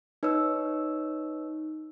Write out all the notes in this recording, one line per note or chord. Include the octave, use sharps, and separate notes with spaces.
D#4 B4 C#5 E6